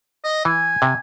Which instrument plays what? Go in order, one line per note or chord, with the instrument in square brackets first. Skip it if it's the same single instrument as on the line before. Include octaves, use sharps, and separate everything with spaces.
[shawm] D#5
[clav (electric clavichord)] E3 [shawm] G#5
[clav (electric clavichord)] C3